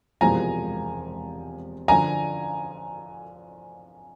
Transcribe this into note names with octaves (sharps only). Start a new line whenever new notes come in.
E1 E2 C3 F3 G#3 G#5 A#5
D3 F3 G#5 A#5